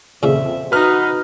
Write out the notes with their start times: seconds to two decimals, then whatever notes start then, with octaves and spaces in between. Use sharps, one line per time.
0.23 F2 A#2 C#3 A4 C5 E5
0.72 D#4 F#4 B4 F6